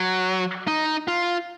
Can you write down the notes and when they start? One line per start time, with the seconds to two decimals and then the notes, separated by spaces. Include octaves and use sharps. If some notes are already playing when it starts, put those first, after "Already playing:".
Already playing: F#3
0.67 D#4
1.08 F4